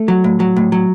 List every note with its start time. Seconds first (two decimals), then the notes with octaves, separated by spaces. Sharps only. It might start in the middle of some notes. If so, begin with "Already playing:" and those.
Already playing: A3
0.08 F#3
0.24 A2
0.40 F#3
0.56 A2
0.72 F#3